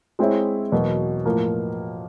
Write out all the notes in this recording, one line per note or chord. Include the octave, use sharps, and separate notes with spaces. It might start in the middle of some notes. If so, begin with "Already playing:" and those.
G#3 C4 E4 G#4 C#5
E2 B2 F#3 A#3
A2 F3 A#3